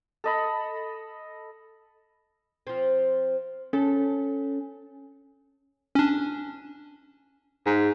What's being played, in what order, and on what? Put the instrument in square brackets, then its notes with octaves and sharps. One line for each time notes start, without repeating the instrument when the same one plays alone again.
[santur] A4 D#5 B5
[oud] F3 C4
[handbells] C#4 [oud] A4
[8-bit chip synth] C#4 D4
[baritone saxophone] G#2